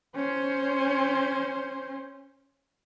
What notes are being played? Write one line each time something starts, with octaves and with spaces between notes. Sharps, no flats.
C#4 C5